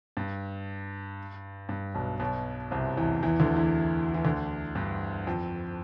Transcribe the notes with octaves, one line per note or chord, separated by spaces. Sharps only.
G2
G2
B1 B2
B1 B2
C2 C3
E2 E3
E2 E3
D2 D3
E2 E3
E3
D2 D3
G2
F2